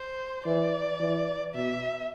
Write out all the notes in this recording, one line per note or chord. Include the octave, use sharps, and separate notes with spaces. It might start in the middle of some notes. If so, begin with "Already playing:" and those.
Already playing: C5
E3 D5
E3
B2 E5